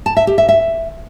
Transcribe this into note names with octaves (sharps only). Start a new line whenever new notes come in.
A5
E5
G4
E5
E5